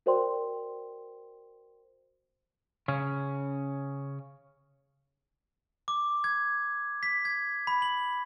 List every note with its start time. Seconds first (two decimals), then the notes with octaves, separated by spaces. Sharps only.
0.06 F#4 A#4 C5 D5 G5 C6
2.88 C#3 C#4
5.88 D6
6.24 G#6
7.03 B6
7.25 G#6
7.67 B5
7.82 F#7